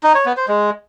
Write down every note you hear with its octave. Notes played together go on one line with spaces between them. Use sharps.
D#4
C#5
B3
C5
G#3